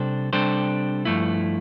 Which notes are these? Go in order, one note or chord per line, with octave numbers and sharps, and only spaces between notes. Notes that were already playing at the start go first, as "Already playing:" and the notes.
Already playing: C3 G3 D4 A4 C5
C3 G3 D4 A4 C5
G2 F3 A3 E4